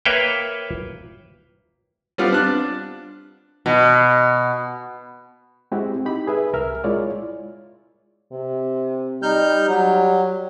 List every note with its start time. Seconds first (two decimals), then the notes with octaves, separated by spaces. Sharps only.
0.05 A#3 B4 C#5 E5 F5 G5
2.18 G3 B3 C4 F4
2.33 D4 F#6
3.66 B2
5.72 G#3 C4 E4 F#4 G4
6.05 D#4 G4 B5
6.27 G#4 B4 E5
6.53 C2 A#4 E5 F6
6.84 G#3 E4 F4 C#5 D5
8.32 C3
9.23 G3 D#4 F6 G6
9.68 F#3